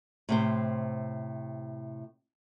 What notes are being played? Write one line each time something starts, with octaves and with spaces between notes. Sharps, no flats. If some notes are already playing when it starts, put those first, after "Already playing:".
A2 C3 C5